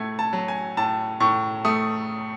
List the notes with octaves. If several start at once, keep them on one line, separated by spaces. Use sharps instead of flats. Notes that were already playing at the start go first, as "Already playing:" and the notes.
Already playing: A2 A3 G#6
A5
F#3
G#5
A2 A5
A2 C#6
A3 D#6